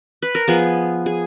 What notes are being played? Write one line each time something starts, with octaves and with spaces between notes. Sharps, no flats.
B4
A#4
F3 B3 G#4
G#4